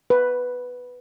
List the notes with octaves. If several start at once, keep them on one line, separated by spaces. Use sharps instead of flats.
B4